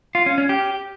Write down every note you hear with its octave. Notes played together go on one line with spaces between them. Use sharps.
F4
C#4
C#4
G4